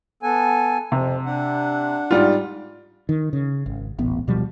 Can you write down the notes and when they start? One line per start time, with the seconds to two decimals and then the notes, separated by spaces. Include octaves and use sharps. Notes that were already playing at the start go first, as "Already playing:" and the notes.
0.23 B3 A4 G#5
0.92 F2 C3 F3
1.25 D4 F#5
2.11 G#2 G3 F4
3.09 D#3
3.33 C#3
3.66 G#1
3.99 D#1 A1 B3
4.27 D1 B2 F3 G3